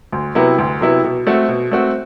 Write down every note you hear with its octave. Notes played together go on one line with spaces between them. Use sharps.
D2
C3 F#3 B3 E4
D2
C3 F#3 B3 E4
B2
A3 C4 F#4
B2
A3 C4 F#4